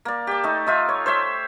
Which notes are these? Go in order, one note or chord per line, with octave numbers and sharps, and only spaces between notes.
A#3 D5
G4 A5
A3 D#4
D#4 F4 E5
C#5
C5 C#5 E5